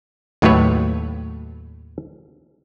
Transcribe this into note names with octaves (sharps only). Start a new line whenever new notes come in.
D#2 A2 F#3 A3 B4 C#5